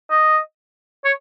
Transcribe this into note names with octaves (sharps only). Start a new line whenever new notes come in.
D#5
C#5